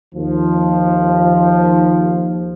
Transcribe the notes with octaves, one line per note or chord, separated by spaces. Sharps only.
D#2 F3